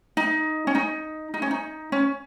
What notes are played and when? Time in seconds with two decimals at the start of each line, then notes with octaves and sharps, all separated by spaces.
0.17 D#4
0.67 C#4
0.75 D#4
1.34 D#4
1.42 C#4
1.51 D#4
1.92 C#4